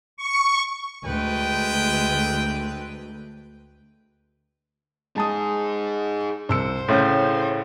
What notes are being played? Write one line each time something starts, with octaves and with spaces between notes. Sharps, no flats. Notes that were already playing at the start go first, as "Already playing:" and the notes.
C#6
D2 G#3 A3 B4 G5
G#3 D#4 G#4 A5 D#6
C2 C5 E6 C#7
A2 C#3 C6 G6